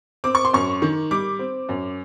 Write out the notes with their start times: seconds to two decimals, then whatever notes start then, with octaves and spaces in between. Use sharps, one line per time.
0.24 C4 D6
0.35 C#6
0.45 C6
0.53 F#2 C#6
0.82 D#3
1.11 G3 D6
1.39 C4
1.69 F#2